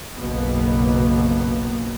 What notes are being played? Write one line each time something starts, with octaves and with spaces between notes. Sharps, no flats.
F#1 B1 B2 A#3 B3